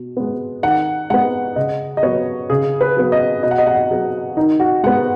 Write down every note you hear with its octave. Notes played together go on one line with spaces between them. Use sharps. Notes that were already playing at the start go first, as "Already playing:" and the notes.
Already playing: B2
G#3 B3
D#3 F#5
G#3 B3 F#5
C#3 D#5
D#5
F#3 B3 C#5
C#3 G#4
B4
F#3 B3
D#5
B2 D#5
F#5
D#5
F#5
D#5
F#3 B3 G#4
D#3 D#4
F#4
G#3 B3 F#5